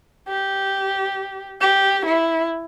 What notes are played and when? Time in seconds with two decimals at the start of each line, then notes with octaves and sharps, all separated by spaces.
0.29 G4
1.60 G4
2.04 E4